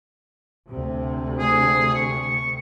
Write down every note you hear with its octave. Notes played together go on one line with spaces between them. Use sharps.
D2 C3
G#4
C#6